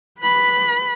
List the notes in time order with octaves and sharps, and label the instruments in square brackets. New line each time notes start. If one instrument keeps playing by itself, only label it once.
[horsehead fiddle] B4 B5